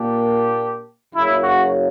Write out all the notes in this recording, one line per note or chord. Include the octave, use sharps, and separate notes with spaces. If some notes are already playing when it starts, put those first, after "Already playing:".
Already playing: A#2 A#3 D4 G4
F#1 F#2 C#3 E4
F#4